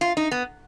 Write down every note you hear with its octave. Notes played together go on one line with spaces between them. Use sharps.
F4
D#4
B3